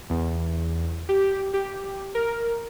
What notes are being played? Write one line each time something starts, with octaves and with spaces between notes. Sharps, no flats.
E2
G4
G4
A#4